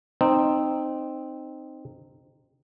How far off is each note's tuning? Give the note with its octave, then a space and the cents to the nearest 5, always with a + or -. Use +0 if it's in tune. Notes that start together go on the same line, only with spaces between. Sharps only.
C4 +0 D#4 -15